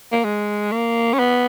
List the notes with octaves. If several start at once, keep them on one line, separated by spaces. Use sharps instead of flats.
A#3
G#3
A#3
C#4
B3